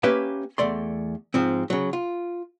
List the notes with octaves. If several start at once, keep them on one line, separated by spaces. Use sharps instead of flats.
A#3 C#4 G4 B4 E5 F5
E2 A3 D5 C6
G#2 F3 C4
C#3 F#3
F4